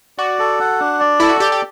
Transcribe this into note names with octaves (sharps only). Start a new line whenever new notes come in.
F#4 D5
A4
F#5
D4
D5
E4 A4
F#4
G4 D5
G4